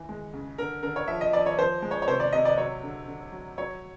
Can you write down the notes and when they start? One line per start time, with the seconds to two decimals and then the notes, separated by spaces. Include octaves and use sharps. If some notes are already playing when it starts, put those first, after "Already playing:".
Already playing: E3
0.09 G#3
0.33 C#3
0.58 D3 A#4
0.83 D3 A#4
0.96 C#5
1.08 F3 E5
1.21 D#5
1.33 F3 D5
1.46 C#5
1.58 F3 C5
1.82 G#3
1.91 C#5
2.02 C#5
2.08 C3 C5
2.20 D5
2.33 C3 D#5
2.45 D5
2.58 F#3 C#5
2.83 D3
3.08 D3
3.32 F#3
3.58 F#3 C#5